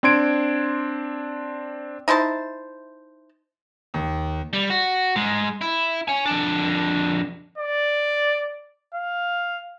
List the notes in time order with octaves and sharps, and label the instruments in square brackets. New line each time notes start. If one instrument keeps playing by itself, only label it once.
[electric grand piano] C4 D4 C6 G#6 D7
[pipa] D#4 E4 C5 A5
[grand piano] D#2
[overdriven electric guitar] G3
F#4
G#2 G#3
E4
C#5 G#5
F2 D4
[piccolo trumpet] D5
F5